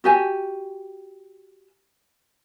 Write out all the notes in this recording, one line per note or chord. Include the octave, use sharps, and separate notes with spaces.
F#4 G4 G#5